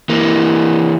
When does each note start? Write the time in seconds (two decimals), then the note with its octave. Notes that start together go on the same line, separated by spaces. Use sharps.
0.09 E3 A#3